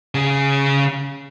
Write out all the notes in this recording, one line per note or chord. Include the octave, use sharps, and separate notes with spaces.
C#3 G#4